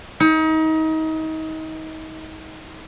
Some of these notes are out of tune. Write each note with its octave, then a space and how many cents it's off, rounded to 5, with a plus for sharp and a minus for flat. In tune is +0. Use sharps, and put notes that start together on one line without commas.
D#4 +30